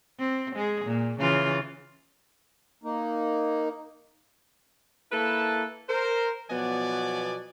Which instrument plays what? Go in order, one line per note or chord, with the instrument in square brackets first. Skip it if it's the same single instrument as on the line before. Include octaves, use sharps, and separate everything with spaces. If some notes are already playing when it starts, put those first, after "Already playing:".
[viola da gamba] C4
G#3 G#4
A#2
C#3 E3 F4
[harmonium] A#3 D#4
[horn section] A#3 E4 A4 B4 A5
A#4 C5
B2 F3 F#3 B3 D5 G#5